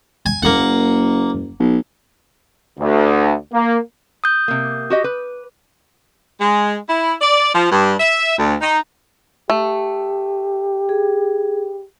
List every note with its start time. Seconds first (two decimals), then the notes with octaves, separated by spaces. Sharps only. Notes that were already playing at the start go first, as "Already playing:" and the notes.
0.26 G#5
0.43 F#1 A#3 F#5
1.60 B1
2.79 D2
3.53 A#3
4.24 D#6 G6
4.48 C3 A#3
4.90 F#4 G4 D#5
5.04 B4
6.40 G#3
6.89 E4
7.21 D5
7.54 F3
7.71 G2
8.00 E5
8.38 D2
8.60 D#4
9.50 A3 G4
10.89 G#4